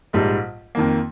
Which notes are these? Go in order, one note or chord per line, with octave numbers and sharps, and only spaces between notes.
A#1 G#2 G3
F2 D#3 A#3